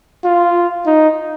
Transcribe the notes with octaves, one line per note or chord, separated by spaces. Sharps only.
F4
D#4